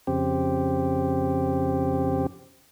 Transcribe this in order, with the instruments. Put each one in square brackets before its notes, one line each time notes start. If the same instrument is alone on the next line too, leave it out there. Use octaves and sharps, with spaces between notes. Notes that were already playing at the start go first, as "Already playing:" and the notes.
[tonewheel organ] F2 C#3 C4 G4